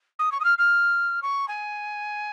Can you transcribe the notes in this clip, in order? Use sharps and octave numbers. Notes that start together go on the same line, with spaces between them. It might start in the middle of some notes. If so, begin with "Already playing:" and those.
D#6
C#6
D#6
F6
F6
C#6
G#5